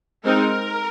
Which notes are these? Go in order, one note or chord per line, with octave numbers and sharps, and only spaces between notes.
G#3 C4 D#4 A#4